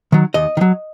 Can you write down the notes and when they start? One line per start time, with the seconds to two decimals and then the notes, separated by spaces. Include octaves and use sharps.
0.12 D#3 F#3
0.34 D#2 D#5
0.57 D#3
0.61 F#3